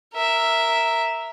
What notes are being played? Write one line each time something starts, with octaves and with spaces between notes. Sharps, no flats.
A#4 E5